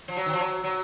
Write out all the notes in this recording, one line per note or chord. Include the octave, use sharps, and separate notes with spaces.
F3
F#3
D#3
F3
F#3
F#3